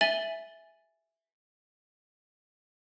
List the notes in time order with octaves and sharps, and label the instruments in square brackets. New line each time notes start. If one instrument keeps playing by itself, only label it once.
[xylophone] E5 G#5 A6 F#7 G7